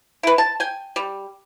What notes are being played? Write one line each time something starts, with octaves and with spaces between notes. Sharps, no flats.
E4 B4
A5
G5 G#5
G3